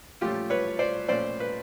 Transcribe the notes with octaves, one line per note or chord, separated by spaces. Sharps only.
A#2 F3 A3 C#4 F4 G4
B4 C#5
C5 D5
A#2 F3 A3 C#4 C5 D5
B4